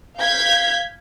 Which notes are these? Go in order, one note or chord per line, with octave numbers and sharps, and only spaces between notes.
F5 G6 G#6 B6